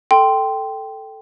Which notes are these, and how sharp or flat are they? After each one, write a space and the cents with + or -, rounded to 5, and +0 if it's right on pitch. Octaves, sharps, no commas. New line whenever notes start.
A4 +0 G5 -5 C6 -5